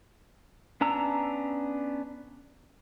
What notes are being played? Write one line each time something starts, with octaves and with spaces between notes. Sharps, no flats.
B3 C#4 D4 A#5 E6